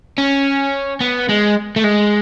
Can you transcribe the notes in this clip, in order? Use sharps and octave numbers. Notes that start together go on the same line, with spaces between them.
C#4
B3
G#3
A3
G#3